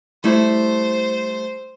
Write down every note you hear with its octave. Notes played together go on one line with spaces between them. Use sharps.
G3 A3 E4 C5